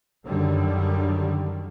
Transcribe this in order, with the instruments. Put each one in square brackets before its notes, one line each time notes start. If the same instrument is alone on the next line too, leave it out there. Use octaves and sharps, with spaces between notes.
[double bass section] F#2 D3 D#3 G3